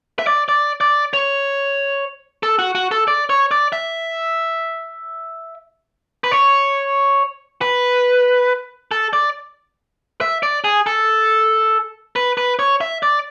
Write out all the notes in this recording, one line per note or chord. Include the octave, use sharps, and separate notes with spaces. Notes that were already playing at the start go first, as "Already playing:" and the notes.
E5
D5
D5
D5
C#5
A4
F#4
F#4
A4
D5
C#5
D5
E5
B4
C#5
B4
A4
D5
E5
D5
G#4
A4
B4
B4
C#5
E5
D5